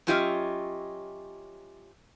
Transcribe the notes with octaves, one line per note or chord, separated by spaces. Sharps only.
F#3 C#4 F4 G4 D#5 E5